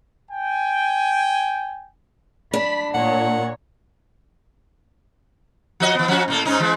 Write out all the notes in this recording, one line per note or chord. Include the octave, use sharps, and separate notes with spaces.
G5 G#5
D4 B5 B6
A#2 C#5 F#5
F3 F#4 D#5
E3 B3
F3 C#4 F#4
A2 A#3 A4
G#2 C#4 D#4
E3 G#3